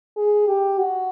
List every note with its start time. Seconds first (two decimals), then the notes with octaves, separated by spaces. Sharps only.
0.17 G#4
0.47 G4
0.78 F#4